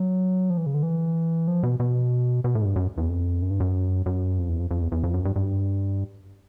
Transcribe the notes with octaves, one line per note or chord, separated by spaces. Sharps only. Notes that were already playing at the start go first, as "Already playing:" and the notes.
Already playing: F#3
F3
E3
C#3
D3
E3
F3
B2
B2
B2
A2
G#2
G2
F#2
E2
F2
F#2
G2
F#2
F#2
F2
E2
F2
F2
E2
E2
F2
F#2
G2
G2